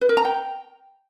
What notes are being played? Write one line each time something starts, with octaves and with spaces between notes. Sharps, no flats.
B4
A#4
A#5
G5